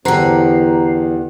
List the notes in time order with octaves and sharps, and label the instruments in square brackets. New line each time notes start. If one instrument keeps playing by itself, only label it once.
[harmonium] E2 [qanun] D3 [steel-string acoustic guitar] G4 F#5 [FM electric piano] C5 A#5 C7